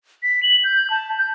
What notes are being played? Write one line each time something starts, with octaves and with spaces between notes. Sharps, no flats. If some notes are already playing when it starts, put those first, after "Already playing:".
B6
F#7
G6
A5
G6